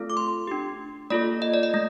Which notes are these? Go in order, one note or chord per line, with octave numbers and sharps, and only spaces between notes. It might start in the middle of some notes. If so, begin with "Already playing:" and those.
Already playing: A3 C4 F4 A4
D6
C6
D4 G4
A#3 F4 A4 D5
D#5
D5
D#5
A3